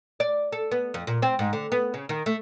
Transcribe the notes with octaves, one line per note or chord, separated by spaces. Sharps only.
D5
A4
B3
F2
A#2
C4
G#2
D3
B3
C#3
D#3
A3